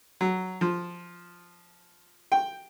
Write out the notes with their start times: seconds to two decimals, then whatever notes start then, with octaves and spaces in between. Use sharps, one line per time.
0.21 F#3
0.61 F3
2.32 G5